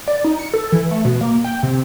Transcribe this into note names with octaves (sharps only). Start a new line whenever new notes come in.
D5
D#4
C#7
A4
E3
A3
B2
A#3
G5
C3